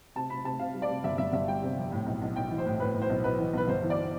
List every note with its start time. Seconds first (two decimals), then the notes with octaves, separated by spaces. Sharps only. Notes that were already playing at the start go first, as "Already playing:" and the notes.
0.16 C3 A5
0.30 C3 B5
0.44 C3 A5
0.59 C3 F5
0.74 G3
0.82 D5
0.89 C3
1.04 G1 E5
1.18 G1 E5
1.33 G1 E5
1.47 G3 G5
1.62 C3
1.77 F2
1.92 A2
2.06 B1
2.21 B1
2.36 B1 G5
2.50 E3
2.58 C5
2.65 A2
2.80 A2 B4
2.94 A2
3.02 C5
3.09 B1
3.24 B1 B4
3.38 E3
3.53 B1 B4
3.68 G1 C5
3.82 E3
3.90 D5